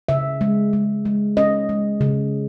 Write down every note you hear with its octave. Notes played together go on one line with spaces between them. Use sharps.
C#3 E5
G#3
G#3
G#3
C#4 D#5
G#3
C#3